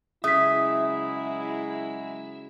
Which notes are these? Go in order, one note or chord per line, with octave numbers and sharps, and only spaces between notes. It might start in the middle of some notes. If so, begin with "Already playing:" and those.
C#3 F#3 G#3 E4 E5 D#6 B6